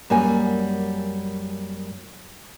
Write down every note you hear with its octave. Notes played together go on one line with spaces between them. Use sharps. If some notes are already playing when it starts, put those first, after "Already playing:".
F#2 G3 A#3 G#5